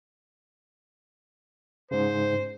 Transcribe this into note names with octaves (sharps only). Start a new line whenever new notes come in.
G#2 C#3 C5